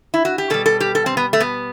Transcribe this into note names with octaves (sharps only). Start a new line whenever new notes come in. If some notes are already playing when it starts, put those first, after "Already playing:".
E4
F#4
G4
B2 G3 A4
A4
G4
A4
C4
B3
A3
B3